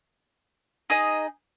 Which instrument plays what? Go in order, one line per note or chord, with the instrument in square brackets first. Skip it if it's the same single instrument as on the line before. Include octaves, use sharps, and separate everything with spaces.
[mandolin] D#4 G#4 D#5